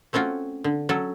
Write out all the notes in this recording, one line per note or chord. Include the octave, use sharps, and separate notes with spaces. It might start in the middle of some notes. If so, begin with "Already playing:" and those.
A3 C4 C#4 F4 F#4
D3
F#3 C#4 A4